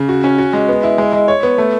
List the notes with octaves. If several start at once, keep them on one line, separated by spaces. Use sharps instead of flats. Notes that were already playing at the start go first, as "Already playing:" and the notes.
Already playing: C#3
F#4
C#4
F#4
G#3
B3
E4
G#3
G#3
C#5
B3
A3